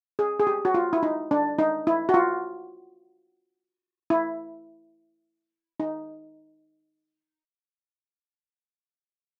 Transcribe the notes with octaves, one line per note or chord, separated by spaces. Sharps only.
G#4
G#4
G4
F#4
F4
E4
D#4
D4
D#4
E4
F#4
F4
E4
D#4